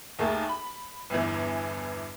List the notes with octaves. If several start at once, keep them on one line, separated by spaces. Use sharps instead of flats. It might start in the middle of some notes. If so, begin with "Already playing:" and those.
D#2 A3 A#3 G#4 A5
B5
G1 E2 E3